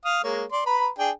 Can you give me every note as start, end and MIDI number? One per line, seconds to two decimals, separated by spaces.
0.05 0.23 77
0.05 0.23 87
0.24 0.44 56
0.24 0.44 58
0.24 0.44 73
0.52 0.63 74
0.52 0.63 84
0.66 0.88 71
0.66 0.88 82
0.66 0.88 83
0.99 1.11 62
0.99 1.11 68
0.99 1.11 79